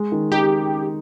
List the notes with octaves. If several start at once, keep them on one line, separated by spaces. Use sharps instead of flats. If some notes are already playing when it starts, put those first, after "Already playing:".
Already playing: G#3
D#3
D#4 G4